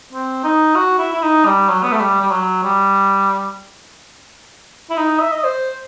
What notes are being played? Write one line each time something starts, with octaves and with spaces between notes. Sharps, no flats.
C4
D#4
F#4
E4
E4
D#4
G3
F#3
B3
A3
G3
G3
F#3
G3
E4
D#4
E5
D#5
C5